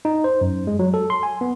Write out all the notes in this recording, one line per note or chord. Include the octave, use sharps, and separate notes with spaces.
D#4
C5
F#2
G#3
F#3
A4
C6
G#5
B3